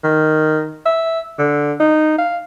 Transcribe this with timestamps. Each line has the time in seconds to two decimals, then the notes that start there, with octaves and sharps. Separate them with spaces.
0.04 D#3
0.86 E5
1.39 D3
1.80 D#4
2.18 F5